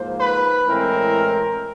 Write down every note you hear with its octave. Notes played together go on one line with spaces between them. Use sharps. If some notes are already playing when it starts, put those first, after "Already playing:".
Already playing: G#2 F3 A#3 C5
B4
A2 E3 G#3 C4 A#4